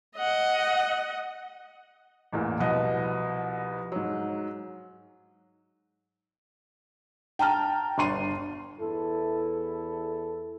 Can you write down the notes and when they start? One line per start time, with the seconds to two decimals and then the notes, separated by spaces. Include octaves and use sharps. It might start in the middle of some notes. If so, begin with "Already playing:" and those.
0.16 D#5 F#5
2.32 A1 E2 A#2
2.60 C2 B2 F3 D#5 F#5
3.92 G#2 F#3
7.39 G5 A5 A#5 F6
7.98 G1 D4 C6 D#7
8.80 E2 E4 A4